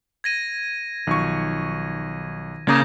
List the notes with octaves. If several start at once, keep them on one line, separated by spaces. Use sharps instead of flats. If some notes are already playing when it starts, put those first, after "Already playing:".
G#6 A#6 D#7
B1 D#3 F3 C#6
C#3 A#3 A#5 D6 D#6 G6 A#6